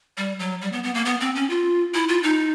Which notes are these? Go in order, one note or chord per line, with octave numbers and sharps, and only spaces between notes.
G3
F#3
G3
B3
B3
A#3
B3
C4
C#4
F4
E4
F4
D#4